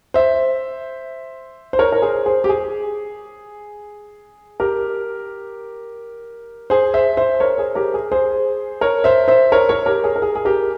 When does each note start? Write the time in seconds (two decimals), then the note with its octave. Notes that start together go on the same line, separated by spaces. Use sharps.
0.14 C5 E5
1.73 C5
1.79 A#4 C#5
1.92 A#4
2.02 G#4 C5
2.26 G#4 C5
2.44 G4
2.49 G#4
4.60 G4 A#4
6.70 G#4 C5
6.94 C5 E5
7.17 C5 E5
7.40 A#4 C#5
7.58 G#4 C5
7.75 G4 A#4
7.94 G#4
8.12 G#4 C5
8.81 A#4 C#5
9.04 C5 E5
9.28 C5 E5
9.52 A#4 C#5
9.69 A#4 C#5
9.86 G4 A#4
10.04 G#4
10.16 A#4
10.22 G#4
10.35 G#4
10.45 G4 A#4